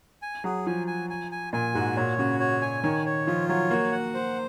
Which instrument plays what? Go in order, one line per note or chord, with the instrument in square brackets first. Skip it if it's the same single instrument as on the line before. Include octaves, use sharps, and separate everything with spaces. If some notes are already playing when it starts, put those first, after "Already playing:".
[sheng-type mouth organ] G#5
[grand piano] F#3 [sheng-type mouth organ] G#4
[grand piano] F3 [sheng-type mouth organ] G#5
[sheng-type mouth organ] G#5
G#5
G#5
[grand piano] A#2 [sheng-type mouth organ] G#5
[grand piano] G#2 [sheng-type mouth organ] F#4
[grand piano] A#2 [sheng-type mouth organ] C#5
[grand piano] C#3 [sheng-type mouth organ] F#4
[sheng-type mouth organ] C#5
G#5
[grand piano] D#3 [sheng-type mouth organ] C#5
[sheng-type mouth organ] C#5
[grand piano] F3 [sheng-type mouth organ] F4
[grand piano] F#3 [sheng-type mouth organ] C#5
[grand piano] A#3 [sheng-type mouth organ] F#4
[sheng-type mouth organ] F#5
C5